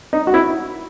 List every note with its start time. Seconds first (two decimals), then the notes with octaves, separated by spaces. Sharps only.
0.13 D#4
0.27 F#4
0.34 E4